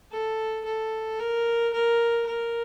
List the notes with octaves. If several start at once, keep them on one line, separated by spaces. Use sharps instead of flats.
A4
A4
A#4
A#4
A#4